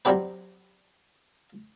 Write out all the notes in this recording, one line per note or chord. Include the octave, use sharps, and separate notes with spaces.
F#3 G3 C4 D4 G4 B4